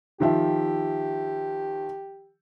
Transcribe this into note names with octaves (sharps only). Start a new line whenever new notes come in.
D#3 F3 G4 E5